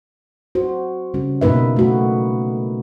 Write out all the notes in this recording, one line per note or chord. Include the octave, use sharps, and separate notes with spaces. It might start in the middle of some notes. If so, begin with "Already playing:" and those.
F#4 C5
C#3 G3 C#4 F#4
B2 A#3 D#4 B4 E5
A3 F#4